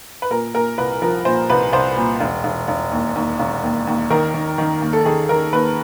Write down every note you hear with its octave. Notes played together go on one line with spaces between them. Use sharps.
B4
A#2 A#4
A#2 A#4
C2 B4
F3 A#4
A#2 C5
C2 B4
C2 C5
A#2
E1
E1
E1
D#2
D#2
E1
D#2
D#2
D#3 A#4
D#3
D#3
D#2
A4
D#3 G#4
D#3 A#4
D#2 B4